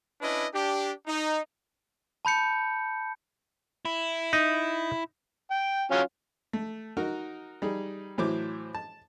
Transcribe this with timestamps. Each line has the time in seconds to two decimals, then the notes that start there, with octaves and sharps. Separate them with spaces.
0.21 C#4 D4 E4 B4 D#5
0.53 D4 G4
1.07 D#4
2.25 A5 B5 G6 C#7
3.85 E4
4.33 D#4
5.51 G5
5.91 F#3 C#4 F4
6.53 A3
6.97 D#4 F#4 A#4
7.62 G3 D#4 G#4
8.18 A2 E3 F#3 E4 C5 D6
8.75 A5